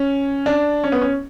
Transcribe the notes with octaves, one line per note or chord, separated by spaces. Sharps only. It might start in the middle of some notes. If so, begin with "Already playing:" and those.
Already playing: C#4
D4
C#4
B3
C#4